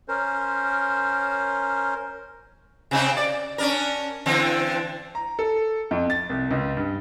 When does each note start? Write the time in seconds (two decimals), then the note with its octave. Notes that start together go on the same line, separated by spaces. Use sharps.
0.08 C#4 A#4 C5
2.91 C3 C4 D#4
3.17 D5
3.58 C#4 D4 A#4
4.26 D3 E3 C4
5.15 A#5
5.39 A4
5.91 F2
6.10 A6
6.30 C2
6.51 C#2
6.77 G2